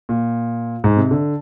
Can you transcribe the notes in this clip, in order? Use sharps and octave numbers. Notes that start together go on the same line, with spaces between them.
A#2
G#2
C3
D3